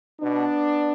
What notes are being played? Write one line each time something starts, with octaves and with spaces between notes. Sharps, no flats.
B2 B3 D4